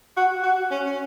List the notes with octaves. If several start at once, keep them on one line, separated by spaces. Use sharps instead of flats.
F#4
F#4
C#4
C#4